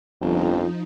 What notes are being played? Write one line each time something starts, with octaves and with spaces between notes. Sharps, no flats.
G1 F2 F3 D#4